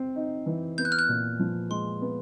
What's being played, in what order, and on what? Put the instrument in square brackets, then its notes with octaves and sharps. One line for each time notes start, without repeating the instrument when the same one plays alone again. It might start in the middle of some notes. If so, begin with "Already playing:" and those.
Already playing: [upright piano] C4
D#4
E3
[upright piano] B3 [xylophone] G6
[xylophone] F#6
F6
F#6
[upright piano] A#2
F3
[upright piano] G#3 [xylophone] C6
[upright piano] B3